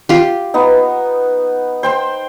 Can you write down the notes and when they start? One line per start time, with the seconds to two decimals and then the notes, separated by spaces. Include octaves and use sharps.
0.09 F4 G4
0.54 B3 D#4
1.83 C5 G5 C6